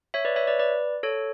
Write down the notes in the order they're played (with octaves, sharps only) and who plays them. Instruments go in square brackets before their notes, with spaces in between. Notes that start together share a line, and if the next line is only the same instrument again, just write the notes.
[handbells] C#5 E5
B4 D5
C#5 E5
B4 D5
B4 D5
A4 C#5